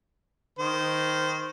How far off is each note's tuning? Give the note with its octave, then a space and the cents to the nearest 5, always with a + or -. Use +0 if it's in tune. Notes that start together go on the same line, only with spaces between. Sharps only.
D#3 +0 C5 -20